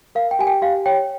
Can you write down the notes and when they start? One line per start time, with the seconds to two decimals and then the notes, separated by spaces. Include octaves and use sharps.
0.15 A#4 F5
0.31 G5
0.39 G4 G#5
0.47 G5
0.62 G4 F5
0.86 C#5 G5